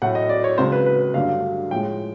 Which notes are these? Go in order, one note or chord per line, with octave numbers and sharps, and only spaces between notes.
A2 F#3 A3 F#5
D#5
D5
C#5
C#2 C#3 F#3 C5
B4
B4
G2 D3 F#3 A3 F5
A2 F3 G#3 G5